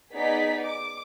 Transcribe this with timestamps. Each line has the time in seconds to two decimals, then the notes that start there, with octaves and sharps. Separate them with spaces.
0.13 B3 D#4 G#4 D5 B6
0.65 D6